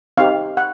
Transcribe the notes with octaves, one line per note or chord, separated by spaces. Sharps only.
C4 D#4 G4 F5
F#5